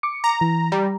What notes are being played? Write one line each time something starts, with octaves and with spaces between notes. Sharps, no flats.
D6 C#7
A#5
E3
G3 G4 A#5